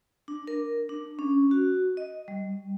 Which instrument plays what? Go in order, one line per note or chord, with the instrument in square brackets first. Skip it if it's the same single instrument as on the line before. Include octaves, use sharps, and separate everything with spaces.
[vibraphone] D4
A#4
D4
C#4
F#4
D#5
G3